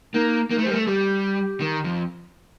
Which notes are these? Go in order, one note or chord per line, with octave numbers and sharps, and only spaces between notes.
A#3 D#4
A#3 D#4
A3
G3 C5
A3 A#4
A4
G3 G4
D#3
F2